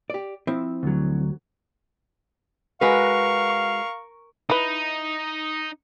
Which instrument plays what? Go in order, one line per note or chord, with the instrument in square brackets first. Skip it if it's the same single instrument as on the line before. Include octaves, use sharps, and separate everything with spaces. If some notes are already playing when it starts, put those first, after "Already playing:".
[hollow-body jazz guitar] G4 D5
F3 C4 E4
[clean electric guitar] D2 F#3
[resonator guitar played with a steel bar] G#3 F#4 B4 [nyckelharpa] A#4 C#6 [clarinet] F5
[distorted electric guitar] D#4 [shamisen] E4 B4